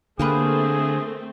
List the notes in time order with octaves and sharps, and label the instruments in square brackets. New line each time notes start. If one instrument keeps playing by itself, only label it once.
[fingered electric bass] D3 [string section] A3 C4 [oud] A#3 G4 B4 [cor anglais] G#4